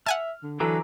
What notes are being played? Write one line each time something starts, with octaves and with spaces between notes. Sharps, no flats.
E5 F#5 G#5 A5 F6
D3
D3 E3 F#3 A4 B4 A#5 D6